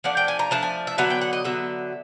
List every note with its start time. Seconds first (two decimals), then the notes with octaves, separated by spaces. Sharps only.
0.04 F3 A3 D4 F#5
0.17 G5
0.28 G#5
0.39 A#5
0.51 F3 A3 D4 A5
0.63 G#5
0.87 E5
0.98 D3 F#3 B3 F#5
1.10 G5
1.21 F#5
1.33 D#5
1.45 D3 F#3 B3 E5